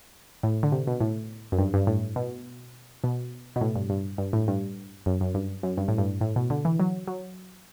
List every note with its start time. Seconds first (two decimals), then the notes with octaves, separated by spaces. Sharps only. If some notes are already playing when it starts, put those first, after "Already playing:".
0.43 A2
0.63 D3
0.72 C3
0.87 B2
1.00 A2
1.52 F#2
1.58 G2
1.74 G2
1.87 A2
2.16 B2
3.04 B2
3.56 B2
3.61 A2
3.76 G2
3.90 G2
4.18 G2
4.33 A2
4.48 G2
5.06 F#2
5.21 F#2
5.34 G2
5.63 F#2
5.77 G2
5.88 A2
5.98 G2
6.21 A2
6.36 B2
6.50 D3
6.65 E3
6.80 F#3
7.08 F#3